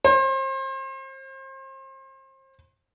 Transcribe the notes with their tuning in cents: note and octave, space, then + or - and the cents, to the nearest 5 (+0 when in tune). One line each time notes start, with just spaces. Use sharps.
C5 +35